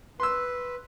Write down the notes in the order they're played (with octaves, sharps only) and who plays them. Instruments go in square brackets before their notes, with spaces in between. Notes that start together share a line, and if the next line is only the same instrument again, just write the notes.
[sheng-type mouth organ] B4 [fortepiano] C6 E6